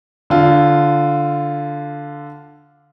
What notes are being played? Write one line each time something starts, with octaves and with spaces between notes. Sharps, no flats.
D3 F4